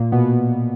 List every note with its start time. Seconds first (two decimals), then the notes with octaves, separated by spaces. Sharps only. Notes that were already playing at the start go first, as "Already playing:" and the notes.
Already playing: A#2 A#3
0.12 B2 B3